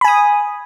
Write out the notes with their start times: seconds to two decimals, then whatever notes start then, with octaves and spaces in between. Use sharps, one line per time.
0.01 B5
0.04 G#5
0.08 D#6